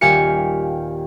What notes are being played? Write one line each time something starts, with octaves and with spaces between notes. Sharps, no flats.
D#1 G4 F5 G#5 C#7